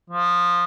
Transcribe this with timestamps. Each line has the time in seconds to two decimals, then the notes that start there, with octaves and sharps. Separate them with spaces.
0.10 F3